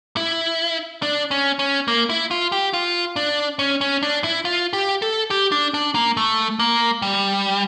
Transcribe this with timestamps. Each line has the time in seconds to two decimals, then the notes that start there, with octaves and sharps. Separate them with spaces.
0.17 E4
1.02 D4
1.31 C#4
1.59 C#4
1.88 A#3
2.10 E4
2.31 F4
2.52 G4
2.73 F4
3.16 D4
3.59 C#4
3.81 C#4
4.03 D4
4.24 E4
4.45 F4
4.73 G4
5.02 A4
5.31 G4
5.52 D4
5.74 D4
5.95 A#3
6.17 A3
6.59 A#3
7.02 G3